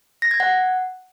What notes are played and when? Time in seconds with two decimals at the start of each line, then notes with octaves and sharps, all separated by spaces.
0.22 A#6
0.31 G#6
0.40 F#5